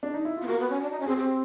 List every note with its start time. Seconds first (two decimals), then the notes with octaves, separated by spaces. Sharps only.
0.03 D4
0.14 D#4
0.25 E4
0.36 F4
0.42 B3
0.47 A#3 F#4
0.59 B3
0.70 C#4
0.82 D4
0.91 D#4
1.00 C#4
1.06 C4 G#4
1.17 C4 G4